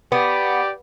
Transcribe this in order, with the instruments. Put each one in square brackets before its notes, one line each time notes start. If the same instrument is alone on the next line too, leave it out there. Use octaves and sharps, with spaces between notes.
[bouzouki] B3 [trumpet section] G4 D5